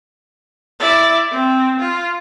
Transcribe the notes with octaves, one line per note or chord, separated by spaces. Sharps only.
E4 D5
C4
F4